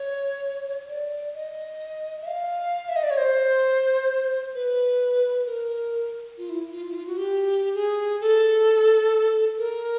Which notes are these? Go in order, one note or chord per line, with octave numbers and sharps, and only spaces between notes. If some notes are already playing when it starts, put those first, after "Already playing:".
Already playing: C#5
D5
D#5
E5
F5
E5
D#5
D5
C#5
C5
B4
A#4
F4
E4
F4
E4
F4
F#4
G4
G#4
A4
A#4